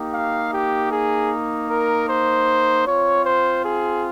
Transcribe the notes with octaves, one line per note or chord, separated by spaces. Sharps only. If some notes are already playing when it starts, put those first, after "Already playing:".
Already playing: A#3 D#4 G4
F5
G4
G#4
A#4
C5
C4 F4 C#5
C5
G#4